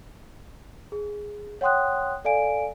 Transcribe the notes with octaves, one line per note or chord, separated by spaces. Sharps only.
G#4
C#5 F#5 G5 C6 D#6 F#6
A4 D5 F5 G#5 D7